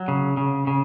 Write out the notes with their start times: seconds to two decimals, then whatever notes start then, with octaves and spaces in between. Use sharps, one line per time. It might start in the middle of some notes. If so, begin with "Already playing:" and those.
Already playing: F#3
0.08 C#3
0.37 C#3
0.67 C#3